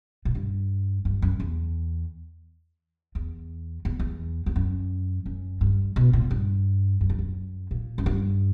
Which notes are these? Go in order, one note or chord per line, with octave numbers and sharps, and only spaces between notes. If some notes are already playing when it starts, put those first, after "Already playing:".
A#2
G2
G2
F#2
E2
E2
E2
E2
E2
F#2
F#2
G2
B2
A#2
G2
F#2
G2
F#2
A#2
F#2
G2